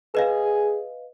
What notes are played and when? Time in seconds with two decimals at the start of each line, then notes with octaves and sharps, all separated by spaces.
0.15 G#4 B4 D#5 F5